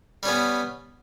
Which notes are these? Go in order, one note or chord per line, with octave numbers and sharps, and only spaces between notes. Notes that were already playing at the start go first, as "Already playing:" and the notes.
G3 B3 C#4